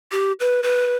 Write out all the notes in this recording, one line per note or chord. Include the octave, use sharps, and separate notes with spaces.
G4
B4
B4